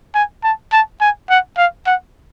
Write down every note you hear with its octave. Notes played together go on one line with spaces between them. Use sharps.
G#5
A5
A5
G#5
F#5
F5
F#5